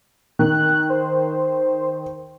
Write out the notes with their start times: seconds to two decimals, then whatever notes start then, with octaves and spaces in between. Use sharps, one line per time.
0.39 D#3 F#6
0.90 C5